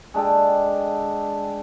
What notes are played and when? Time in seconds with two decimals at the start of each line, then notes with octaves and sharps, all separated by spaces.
0.14 G#3 D4 G4 A4